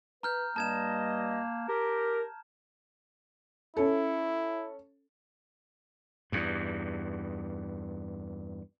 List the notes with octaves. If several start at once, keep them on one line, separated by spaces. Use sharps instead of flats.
B4 A#5 F6 G6
G2 G3 A#3 D#5 A5 G#6 E7
G4 A#4
C#4 E4 A4
E2 G2